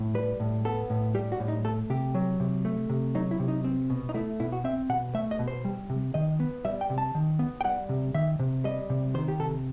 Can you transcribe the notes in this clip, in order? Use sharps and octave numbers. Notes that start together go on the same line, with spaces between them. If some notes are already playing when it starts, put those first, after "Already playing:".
Already playing: A2
G3 B4
A2
B3 A4
A2
G3 G4
F#4
A2
D#4
A3 A4
C3 G4
F#3
C3
A3
C3
F#3 D#4
E4
C3
D#4
C4
B2
D#4
A3 E4
B2 E4
F#4
C4 E5
B2 F#5
A3 E5
D#5
B2
C5
G3
C3
D#3 D#5
B3
G3 E5
G5
C3
A5
D#3
B3
G5
G3 F#5
C3
D#3 E5
C3
G3 D#5
C3
D#3 C5
G4
C3 A4